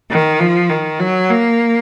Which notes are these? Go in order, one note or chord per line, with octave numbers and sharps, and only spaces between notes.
D#3
F3
D#3
F#3
A#3